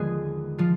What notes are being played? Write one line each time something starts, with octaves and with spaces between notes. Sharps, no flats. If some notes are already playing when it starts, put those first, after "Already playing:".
Already playing: D#2 D3 F3 G#3 B3 G#4 B4
F3 F4